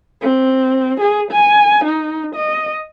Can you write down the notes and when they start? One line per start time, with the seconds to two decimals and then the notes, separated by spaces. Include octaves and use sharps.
0.22 C4
1.01 G#4
1.32 G#5
1.85 D#4
2.35 D#5